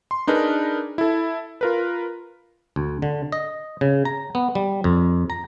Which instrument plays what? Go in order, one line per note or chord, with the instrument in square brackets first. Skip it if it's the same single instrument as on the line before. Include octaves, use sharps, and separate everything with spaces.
[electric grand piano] C6
D4 D#4 G#4 A#4 B4 A#5
E4 A4
F4 A#4 B4
[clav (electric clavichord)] D2
D3
D#5
C#3
A#5
B3
G3
F2
A#5